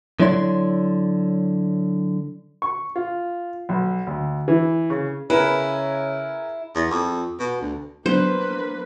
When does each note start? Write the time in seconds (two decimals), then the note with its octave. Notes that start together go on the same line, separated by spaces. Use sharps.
0.20 D3 F#3 E4 C#5 D5 C6
2.62 C#6
2.96 F4
3.69 B1
4.07 D2
4.48 E3
4.90 C#3
5.30 C#3 E4 G#4 A#4 B4
6.75 E2
6.91 F2
7.40 B2
7.61 D2
8.06 F#3 A#3 B3 D4 B4 C5